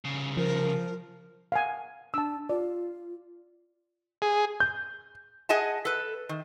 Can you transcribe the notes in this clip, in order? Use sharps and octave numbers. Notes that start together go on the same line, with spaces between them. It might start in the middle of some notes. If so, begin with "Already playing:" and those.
C2 C#3
F3 A#4
F5 F#5 G#5
D4 A5 E6
F4 D5
G#4
G6
G#4 D#5 F#5 G#5 A5
A4 B4
D#3